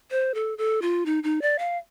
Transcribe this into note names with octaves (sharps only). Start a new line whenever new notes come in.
C5
A4
A4
F4
D#4
D#4
D5
F5